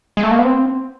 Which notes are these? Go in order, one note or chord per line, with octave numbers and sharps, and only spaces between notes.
G#3
A3
A#3
B3
C4